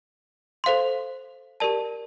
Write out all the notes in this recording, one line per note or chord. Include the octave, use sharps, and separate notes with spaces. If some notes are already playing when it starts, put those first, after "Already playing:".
A4 C5 F5 C6
G4 A#4 D5 A5